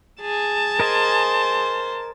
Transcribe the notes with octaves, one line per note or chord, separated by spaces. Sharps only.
G#4 A5
A#4 C5 D#5 G#5